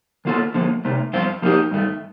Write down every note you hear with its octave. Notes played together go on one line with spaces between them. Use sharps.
D#3 A#3 F4 A4
D3 F3 A#3
C3 D#3 A3
G2 F3 C4 F4
F3 A#3 D#4 G4
G2 D#3 A3